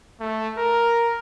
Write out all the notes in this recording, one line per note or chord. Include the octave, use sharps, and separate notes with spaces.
A3
A#4